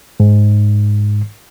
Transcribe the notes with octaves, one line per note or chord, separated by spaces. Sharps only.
G#2